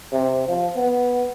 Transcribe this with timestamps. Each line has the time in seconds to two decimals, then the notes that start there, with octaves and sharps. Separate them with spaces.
0.12 C3
0.48 F3
0.76 B3